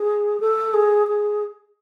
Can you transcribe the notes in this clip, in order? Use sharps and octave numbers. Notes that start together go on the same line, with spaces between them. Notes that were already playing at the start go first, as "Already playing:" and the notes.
Already playing: G#4
A4
G#4
G#4